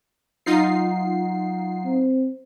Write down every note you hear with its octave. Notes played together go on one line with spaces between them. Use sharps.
F#3 D#4 F4 F#5 C7
C4